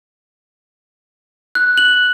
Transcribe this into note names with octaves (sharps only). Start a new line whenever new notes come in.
F#6
F#7